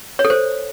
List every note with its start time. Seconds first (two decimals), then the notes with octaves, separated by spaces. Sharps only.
0.19 C#5
0.25 A4
0.30 C5